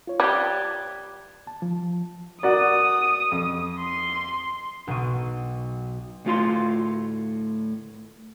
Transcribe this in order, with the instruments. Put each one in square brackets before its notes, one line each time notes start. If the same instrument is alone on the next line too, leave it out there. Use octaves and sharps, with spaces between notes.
[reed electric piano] F4 C#5
[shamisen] G3 G4 [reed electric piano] F#6 G#6 A6
[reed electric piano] A5
F3
[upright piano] F#4 A#4 D5 [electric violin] D#6
[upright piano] F2
[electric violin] C6
[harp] B1 B2 C#6 D#7
[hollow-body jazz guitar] D2 A2 F4 C6